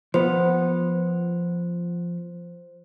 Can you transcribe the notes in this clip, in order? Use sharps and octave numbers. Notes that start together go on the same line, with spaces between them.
F3 B3 C5